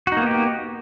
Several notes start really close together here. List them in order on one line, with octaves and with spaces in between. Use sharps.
F#4 D#4 A#3 B3 G4